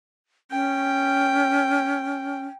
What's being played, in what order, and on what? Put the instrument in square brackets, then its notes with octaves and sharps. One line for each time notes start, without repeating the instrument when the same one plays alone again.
[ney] C#4 [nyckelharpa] G5